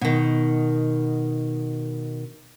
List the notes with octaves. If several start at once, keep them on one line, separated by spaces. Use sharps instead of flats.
B2 D#3